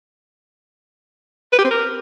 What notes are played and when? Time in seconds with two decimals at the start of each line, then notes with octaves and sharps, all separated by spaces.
1.52 B4
1.58 G4
1.64 C4
1.71 A#4